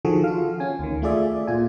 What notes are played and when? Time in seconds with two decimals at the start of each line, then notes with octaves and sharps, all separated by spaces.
0.05 D3 D#3 F3 F#4 G#4 A4
0.24 F4 F5
0.60 C#4 G#5
0.79 D2 D#3
1.02 A3 F4 G#4 D5 E5
1.47 A#2 F4 G#5